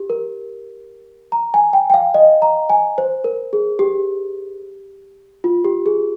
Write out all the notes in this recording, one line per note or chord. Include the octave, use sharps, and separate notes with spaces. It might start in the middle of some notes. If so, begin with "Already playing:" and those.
Already playing: G4
A#4
A#5
G#5
G5
G5
F5
D#5
A#5
G#5
C5
A#4
G#4
G4
F4
G4
G#4